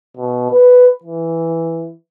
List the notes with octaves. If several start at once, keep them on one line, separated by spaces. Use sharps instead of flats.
B2
B4
E3